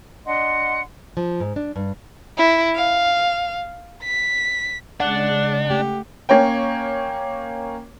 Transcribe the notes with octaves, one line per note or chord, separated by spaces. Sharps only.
D4 D#5 F#5 C6
F3
G#2
D4
G2
E4
F5
B6
C#3 G#3 D4 D5 F#5
A3 G4
A#3 C#4 C#5 G5